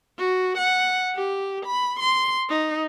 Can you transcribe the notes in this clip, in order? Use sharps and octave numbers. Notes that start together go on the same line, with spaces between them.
F#4
F#5
G4
B5
C6
D#4